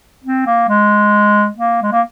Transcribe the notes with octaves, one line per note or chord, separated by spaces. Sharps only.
C4
A#3
G#3
A#3
G#3
A#3